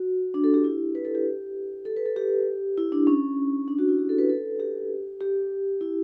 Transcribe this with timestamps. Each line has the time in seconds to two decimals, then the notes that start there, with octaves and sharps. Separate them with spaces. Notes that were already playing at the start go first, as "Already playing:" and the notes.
Already playing: F#4
0.34 D4
0.44 A4
0.54 G4
0.64 E4
0.95 B4
1.05 A4
1.15 G4
1.85 A4
1.97 B4
2.06 A4
2.16 G4
2.78 E4
2.92 D4
3.07 C#4
3.68 D4
3.79 F#4
3.88 E4
3.99 G4
4.09 A4
4.19 B4
4.29 A4
4.60 G4
5.21 G4
5.81 E4